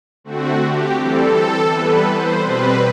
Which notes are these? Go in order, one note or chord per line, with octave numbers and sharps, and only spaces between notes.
D3 A3 C4 F#4
G4
E3 G3 C4 A4
E3 G3 B3 B4
C5
B2 G3 C4 B4